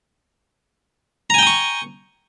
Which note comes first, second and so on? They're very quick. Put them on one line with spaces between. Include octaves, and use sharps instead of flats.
A#5 G#5 G5 D#6 C#6